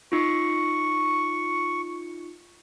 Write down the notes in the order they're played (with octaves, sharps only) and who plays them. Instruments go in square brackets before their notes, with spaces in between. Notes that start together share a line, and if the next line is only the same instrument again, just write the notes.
[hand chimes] D#4 F4 [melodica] C#6